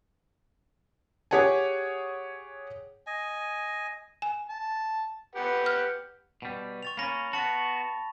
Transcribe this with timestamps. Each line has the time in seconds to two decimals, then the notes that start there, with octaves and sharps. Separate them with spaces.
1.31 G4 G#4 C#5 F#5 G#5
3.07 D#5 G#5
4.22 G#5
4.50 A5
5.35 G4 B4 F#5
5.66 F6
6.42 B2 G3
6.83 C#6 A6 F7
6.97 A#3 C#4 B5 A#6
7.33 B3 F#4 A5 C#6 A6